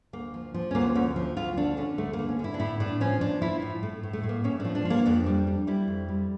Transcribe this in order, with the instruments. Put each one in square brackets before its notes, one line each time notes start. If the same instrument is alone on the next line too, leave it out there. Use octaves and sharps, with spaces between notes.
[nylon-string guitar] D2 A#3
F3
F3
C#4
D2 A#3
D2 C#4
F3
D2 F4
D3 D4
D3 C#4
D2 A3
A#3
D3
C#4
D3 E4
D4
A2 E4
A2 D4
F3 C#4
F3 D4
F3 E4
A2
A2 A3
A2
A3
A2
A#3
A2 C#4
F3 D4
D4
F3
A#3
F2 D4
G3
G3
G3 E4
F2
G3